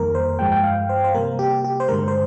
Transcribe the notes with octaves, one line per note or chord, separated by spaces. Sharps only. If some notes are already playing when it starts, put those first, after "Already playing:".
Already playing: F2 D#3 G3 A#3 A#4
C5
G2 F3 G#3 G5
G5
F5
C5
C5
C3 G3 A#3 A#4
G4
G4
C5
G2 D3 G#3 A#4
C5